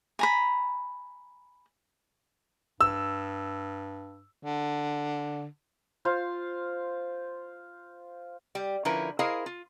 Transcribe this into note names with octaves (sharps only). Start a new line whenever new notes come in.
G#5 A#5 B5
G2 E6
D3
F4 C5 F5
G3 G4
D3 F3 C#4 E4 A#4 B4
E4 G#4 A#4 C5 D#5 F5
F4